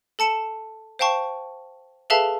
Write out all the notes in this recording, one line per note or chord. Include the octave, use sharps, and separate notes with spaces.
A4 A5 C#7 E7
C5 F5 G5 A5 C#6
G#4 A4 B4 E5 F5 A5